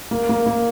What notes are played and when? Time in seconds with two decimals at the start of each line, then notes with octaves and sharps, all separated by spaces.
0.11 A#3
0.29 A#3
0.46 A#3